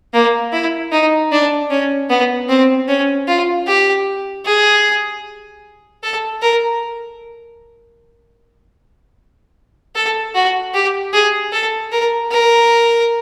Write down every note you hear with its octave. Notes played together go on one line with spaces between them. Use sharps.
A#3
E4
D#4
D4
C#4
B3
C4
C#4
F4
G4
G#4
A4
A#4
A4
F#4
G4
G#4
A4
A#4
A#4